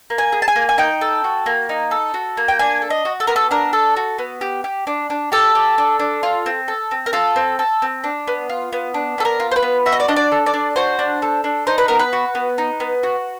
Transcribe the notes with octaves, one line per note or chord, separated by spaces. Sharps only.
A#3
G#5
G#4
A5
G#5
A#3
G#5
D#4 G5
A4
F#4
A#3
D#4
A4
F#4
A#3
G5
D4 G#5
A4
D#5
F#4
A4
B3 A#4
A4
D4 A#4
A4
F#4
B3
G4
G4
D4
D4
G4 A4
G4
D4
D4
F4
C4
A4
C4
A#4
F4 A4
C4
A4
C4
D4
B3
F4
B3
D4
B3 A4
A#4
F4
C5
B4
B3
F#4 E5
D#5
D5
D4 D#5
D5
A4
D5
D4
F#4 C5
D4
A4
D4
D#4 C5
B4
B3 A#4
B4
F#4
B3
D#4
B3
F#4